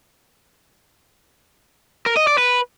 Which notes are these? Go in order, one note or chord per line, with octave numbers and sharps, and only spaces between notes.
A#4
D#5
D5
B4